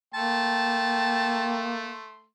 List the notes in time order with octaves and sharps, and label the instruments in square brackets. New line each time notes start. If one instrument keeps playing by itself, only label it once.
[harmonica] A3 C6 [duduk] A#3 [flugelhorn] G5 [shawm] A5